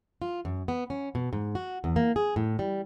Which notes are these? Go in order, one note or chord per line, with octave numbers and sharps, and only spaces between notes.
F4
F#2
B3
C#4
B2
G#2
F#4
E2
A#3
G#4
A2
G3